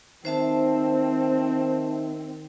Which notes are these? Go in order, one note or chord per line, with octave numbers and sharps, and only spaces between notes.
D#3 C4 C5 E5 A5